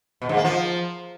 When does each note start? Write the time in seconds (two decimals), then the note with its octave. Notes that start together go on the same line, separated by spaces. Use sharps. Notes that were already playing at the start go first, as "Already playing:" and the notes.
0.22 B2
0.29 G#2
0.37 A#3
0.45 F3